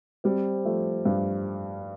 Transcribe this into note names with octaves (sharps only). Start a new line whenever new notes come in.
G3 C4
F3 A3
G2